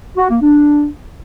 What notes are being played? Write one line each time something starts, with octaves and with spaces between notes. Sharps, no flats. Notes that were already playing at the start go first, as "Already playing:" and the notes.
F#4
A#3
D4